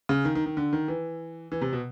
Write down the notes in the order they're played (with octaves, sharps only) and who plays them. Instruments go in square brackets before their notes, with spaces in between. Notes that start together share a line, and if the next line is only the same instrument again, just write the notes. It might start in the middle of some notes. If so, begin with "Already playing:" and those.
[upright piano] C#3
D#3
D#3
D#3
D3
D#3
E3
E3
C3
B2